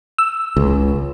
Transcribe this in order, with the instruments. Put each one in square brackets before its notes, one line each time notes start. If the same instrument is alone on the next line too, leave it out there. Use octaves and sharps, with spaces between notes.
[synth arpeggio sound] E6
[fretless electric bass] C#2